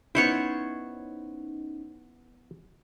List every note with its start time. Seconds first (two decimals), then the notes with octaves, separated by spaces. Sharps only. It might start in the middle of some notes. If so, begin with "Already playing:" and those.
0.15 B3 C#4 D#4 E4 C5 C#5 C#6